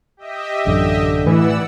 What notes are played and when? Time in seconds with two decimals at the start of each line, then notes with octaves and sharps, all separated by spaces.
0.17 G4 D#5 E5
0.67 A1 F#2 D3
1.26 A2 E3 D5 F#5 E6